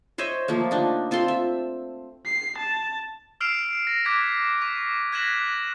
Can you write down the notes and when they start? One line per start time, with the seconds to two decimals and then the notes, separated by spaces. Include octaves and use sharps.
0.18 C5 C#5 D#5 E5
0.48 F3 A3 A#3
0.71 D3 D4 D#4
1.11 C4 F4 A4 C6
1.28 E5
2.25 C7
2.58 A5
3.40 E6 F6 C7 D7 E7 F7
3.87 A#6
4.05 D6 F#6 G#6 A#6 B6 D7
4.62 C#6 B6 F7
5.12 F#6 G#6 A#6 B6 E7 F#7
5.34 F#6